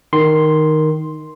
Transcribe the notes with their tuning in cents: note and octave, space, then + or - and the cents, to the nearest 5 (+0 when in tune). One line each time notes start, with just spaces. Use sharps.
D#3 +0 C6 +0